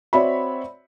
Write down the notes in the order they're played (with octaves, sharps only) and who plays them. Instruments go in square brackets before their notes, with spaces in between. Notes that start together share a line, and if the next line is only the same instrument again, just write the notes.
[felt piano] C4 F#4 C#5 D5 E5 B5